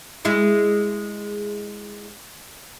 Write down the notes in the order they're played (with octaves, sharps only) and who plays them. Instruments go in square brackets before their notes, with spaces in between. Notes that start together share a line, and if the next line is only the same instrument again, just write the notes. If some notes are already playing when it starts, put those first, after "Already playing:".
[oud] G#3 E4 G#4